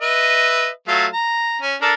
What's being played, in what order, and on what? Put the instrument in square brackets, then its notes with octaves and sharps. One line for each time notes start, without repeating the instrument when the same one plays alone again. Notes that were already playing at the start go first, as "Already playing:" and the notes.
[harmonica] B4 D#5 E5
F#3 A3 F4
A#5
C#4
D4 A4 A#4